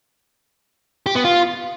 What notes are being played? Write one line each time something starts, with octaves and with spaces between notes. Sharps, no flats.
G4
B3
F4